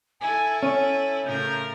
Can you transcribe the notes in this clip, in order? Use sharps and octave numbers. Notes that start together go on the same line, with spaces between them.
E4 A4 G#5
C#4 D#7
A2 C#3 A#4 G6